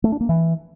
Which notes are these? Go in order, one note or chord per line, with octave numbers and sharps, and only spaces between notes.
A3
D4
A#3
E3